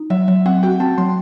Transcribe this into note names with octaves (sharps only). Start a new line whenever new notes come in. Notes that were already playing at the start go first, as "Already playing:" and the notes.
Already playing: D#4
F#3 E5
F#3
C4 F#5
F#4 G5
C4 A5
F#3 C6